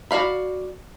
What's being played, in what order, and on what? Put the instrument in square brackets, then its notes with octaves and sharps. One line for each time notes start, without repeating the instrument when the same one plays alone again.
[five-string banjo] F#4 D5 F5 B5